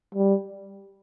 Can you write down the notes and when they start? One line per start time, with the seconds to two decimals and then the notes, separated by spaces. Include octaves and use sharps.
0.15 G3